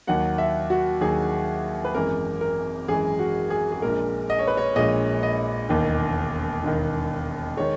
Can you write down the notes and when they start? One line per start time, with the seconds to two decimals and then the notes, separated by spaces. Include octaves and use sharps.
0.07 D#2 D#3 F#3 F#5
0.38 E5
0.70 F#4
1.01 D#2 D#3 F#3 G#4
1.84 B4
1.95 G#1 F#2 E3 G#3 A#4
2.41 A#4
2.88 G#1 F#2 E3 G#3 G#4
3.19 F#4
3.50 G#4
3.72 G#4
3.82 A#1 A#2 G#3 A#4
4.30 D#5
4.39 C#5
4.48 B4
4.57 C#5
4.76 A#1 A#2 G#3 D#5
5.23 D#5
5.69 E1 D#2 D#3
6.63 E1 D#2 D#3
7.57 D#3 G#3 C#5